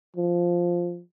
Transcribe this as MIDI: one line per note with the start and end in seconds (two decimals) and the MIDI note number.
0.16 1.01 53